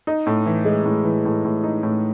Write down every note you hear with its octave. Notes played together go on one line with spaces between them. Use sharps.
D#4
A2
E3
G#3
A2
E3
A2
A2
D#4
A2